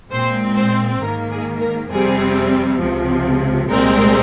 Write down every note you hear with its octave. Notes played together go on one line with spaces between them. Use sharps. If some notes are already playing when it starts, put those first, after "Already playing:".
A#2 G#3 C4 C5
C5
G#2 D#3 A#3 A#4
G#4
A#4
F2 C3 G3 C4 G#4
C#2 C3 F3
C2 A#2 G#3 C4 A#4